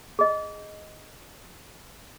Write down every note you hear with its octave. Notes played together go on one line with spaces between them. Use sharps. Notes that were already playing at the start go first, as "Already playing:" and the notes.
G#4 D#5